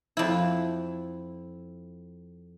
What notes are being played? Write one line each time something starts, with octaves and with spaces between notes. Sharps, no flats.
F2 E4